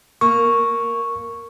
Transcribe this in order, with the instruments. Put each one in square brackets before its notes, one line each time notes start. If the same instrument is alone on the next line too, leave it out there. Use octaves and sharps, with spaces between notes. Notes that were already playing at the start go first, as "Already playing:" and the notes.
[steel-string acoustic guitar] A#3 [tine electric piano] C#6